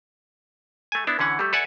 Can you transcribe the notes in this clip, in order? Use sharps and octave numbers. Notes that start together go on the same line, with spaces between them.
A3 G#5
B3 D4 E4
D3 E3 C#4 F#5
G3 A3
A4 B4 D5 E5 F#5 G#5